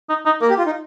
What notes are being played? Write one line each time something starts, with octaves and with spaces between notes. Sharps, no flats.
D#4
D#4
A#3 A#4
G4
F4
D#4